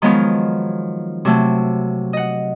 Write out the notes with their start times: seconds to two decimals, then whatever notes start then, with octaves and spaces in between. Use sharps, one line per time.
0.02 D#3 F3 F#3 G#3 B3 F4
1.25 C3 F#3 A3
2.13 D#5 F#5